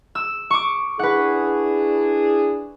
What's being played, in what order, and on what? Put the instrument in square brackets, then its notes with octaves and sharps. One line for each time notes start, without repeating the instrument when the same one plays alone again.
[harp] E6
C#6 D6
[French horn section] D4 E4 G#4 [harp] B4 F#5